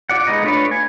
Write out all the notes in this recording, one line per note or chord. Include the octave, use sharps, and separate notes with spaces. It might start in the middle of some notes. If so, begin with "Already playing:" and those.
F4 D5 F#5
G#3 B3 D#4 D#5
A3 D4 F4 B4 C#5
G#5